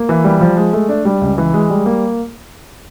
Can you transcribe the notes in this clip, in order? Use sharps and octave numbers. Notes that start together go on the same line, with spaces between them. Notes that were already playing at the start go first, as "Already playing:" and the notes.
Already playing: A#3
E3
G3
F3
G#3
A3
D4
G3
C#2
E3
G#3
G3
A#3